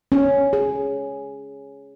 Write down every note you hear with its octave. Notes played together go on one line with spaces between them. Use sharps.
C#4
G#4